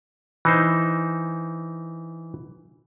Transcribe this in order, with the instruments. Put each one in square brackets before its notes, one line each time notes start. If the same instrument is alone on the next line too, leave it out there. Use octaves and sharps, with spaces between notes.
[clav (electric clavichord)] E3 D#4 C5